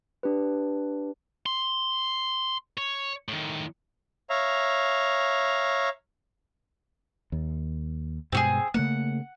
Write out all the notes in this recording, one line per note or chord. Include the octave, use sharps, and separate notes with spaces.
D4 G4 B4
C6
C#5
A2 D#3
C#5 E5 F5 A#5
D#2
G2 B2 G#3 C4 F#4 G#4
C#3 A3 A#3 F#5